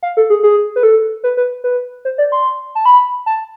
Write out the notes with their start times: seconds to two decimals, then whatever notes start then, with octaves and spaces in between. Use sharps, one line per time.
0.03 F5
0.17 A4
0.30 G#4
0.43 G#4
0.76 B4
0.83 A4
1.24 B4
1.37 B4
1.64 B4
2.05 C5
2.18 D5
2.32 C6
2.75 A5
2.86 B5
3.26 A5